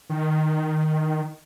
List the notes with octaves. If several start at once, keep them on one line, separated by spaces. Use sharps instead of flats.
D#3